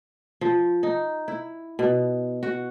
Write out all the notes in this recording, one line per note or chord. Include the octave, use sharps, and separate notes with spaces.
F3
D#4
E4
B2
F#4